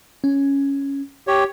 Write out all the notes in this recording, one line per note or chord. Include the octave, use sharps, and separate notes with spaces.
C#4
G4 C#5